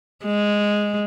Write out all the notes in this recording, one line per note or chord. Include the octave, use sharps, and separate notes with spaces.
G#3